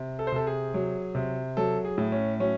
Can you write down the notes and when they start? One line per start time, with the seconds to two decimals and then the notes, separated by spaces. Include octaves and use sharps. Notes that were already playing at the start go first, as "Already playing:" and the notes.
Already playing: C3
0.19 A4
0.27 C5
0.32 C3 A4
0.47 G#4
0.74 F#3
1.15 C3
1.57 F#3 A4
1.85 G#4
1.98 A2
2.12 C#4
2.40 F#3 C#4